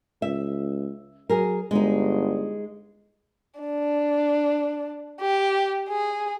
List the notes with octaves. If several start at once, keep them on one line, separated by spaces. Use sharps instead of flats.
C#2 E5
F#3 G#4 A#4
G1 G#3 D#4
D4
G4
G#4